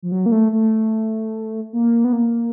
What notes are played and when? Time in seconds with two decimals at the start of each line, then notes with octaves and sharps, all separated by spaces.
0.02 F3
0.12 F#3
0.26 A#3
0.32 A3
0.52 A3
1.73 A#3
2.04 B3
2.13 A#3